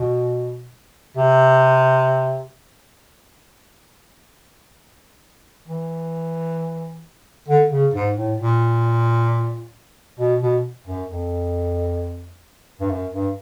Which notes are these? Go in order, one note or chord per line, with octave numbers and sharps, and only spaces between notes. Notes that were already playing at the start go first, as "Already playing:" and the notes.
Already playing: B2
C3
E3
D3
C#3
G#2
A2
A#2
B2
B2
F#2
F2
G2
F#2
G2